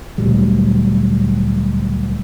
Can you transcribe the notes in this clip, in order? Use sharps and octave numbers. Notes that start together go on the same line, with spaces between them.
D2 A#2 F#3 G3